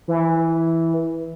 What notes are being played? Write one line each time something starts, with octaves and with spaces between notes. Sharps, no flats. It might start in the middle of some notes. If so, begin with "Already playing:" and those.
E3